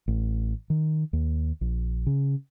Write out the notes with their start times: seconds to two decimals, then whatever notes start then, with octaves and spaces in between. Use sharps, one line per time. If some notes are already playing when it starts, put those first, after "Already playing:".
0.08 A1
0.70 D#3
1.13 D#2
1.61 A#1
2.07 C#3